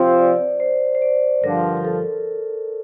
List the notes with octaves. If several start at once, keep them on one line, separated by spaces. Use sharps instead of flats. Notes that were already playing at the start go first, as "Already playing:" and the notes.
Already playing: C3 F3 C4 F4 C5
D5
C5
C5
D5
G2 D3 F3 A#4
A#4
A4